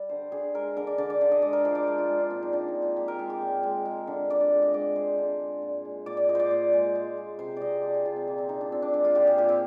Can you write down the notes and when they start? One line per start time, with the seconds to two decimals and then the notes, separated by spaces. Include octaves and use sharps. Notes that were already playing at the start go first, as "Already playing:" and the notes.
Already playing: G3 D5
0.09 D3 C5
0.32 D3 G#4
0.55 G#3 A#4
0.76 D3 A#4
0.87 D5
0.98 D3 D5
1.10 D5
1.21 D3
1.32 D#5
1.42 G#3 D5
1.53 A#4
1.65 F3 C5
1.75 D5
1.86 G#3 C5
1.98 F4
2.09 G#3
2.20 D4
2.30 A#2 C4
2.43 D#4
2.53 F3 D4
2.68 D#4
2.75 A#2
2.82 F4
2.97 G#3 G4
3.08 A#4
3.19 G#3 G#4
3.30 G4
3.42 A#2
3.63 G#3
3.85 G#3
4.07 D3
4.30 D3 D5
4.41 D5
4.52 G#3
4.62 D#5
4.74 G#3 D5
4.96 G#3 C5
5.18 D3
5.40 G#3
5.62 A#2
5.85 G#3
6.06 A#2 D5
6.17 D5
6.29 A#2 D#5
6.35 C5 D5
6.51 A#2
6.73 G#3
6.95 G#3
7.17 G#3
7.39 C3 C5
7.57 C3 D5 D#5
7.76 C5
7.83 F3 D5
7.94 G#4
8.05 C3 F4
8.16 C4
8.27 A#2 A#3
8.38 C4
8.49 A#2 D#4
8.61 D4
8.72 A#2 C4
8.82 D4
8.93 G#3 D4
9.05 F4
9.15 A#2 G4
9.27 G#4
9.38 A#2 G4
9.49 C4